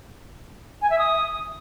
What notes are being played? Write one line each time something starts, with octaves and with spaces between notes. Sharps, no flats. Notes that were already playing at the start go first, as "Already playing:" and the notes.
G#5
E5
D#6